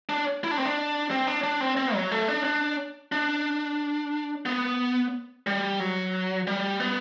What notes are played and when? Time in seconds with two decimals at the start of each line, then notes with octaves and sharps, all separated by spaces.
0.09 D4
0.44 E4
0.51 D4
0.58 C4
0.65 D4
1.11 C4
1.27 D4
1.43 D4
1.60 C4
1.77 C4
1.94 F#3
2.11 A3
2.28 D4
2.45 D4
3.12 D4
4.46 B3
5.47 G3
5.80 F#3
6.47 G3
6.80 B3